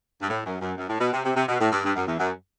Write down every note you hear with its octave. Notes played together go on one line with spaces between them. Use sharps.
G2
A2
F#2
F#2
F#2
A2
B2
C3
C3
C3
B2
A2
G2
G2
F#2
E2
F#2